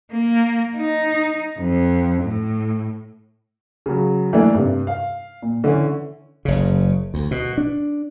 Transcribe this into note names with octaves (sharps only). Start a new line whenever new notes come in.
A#3
D#4
F2
A2
C#3 F#3
E3 A3 A#3 D4 E4
G2 C3
F5
A#2
D3 E3 C#4
F#1 C#3
D2
B2
D4